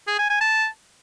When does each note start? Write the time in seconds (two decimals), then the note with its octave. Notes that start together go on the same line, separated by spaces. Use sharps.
0.07 G#4
0.19 G#5
0.30 G#5
0.41 A5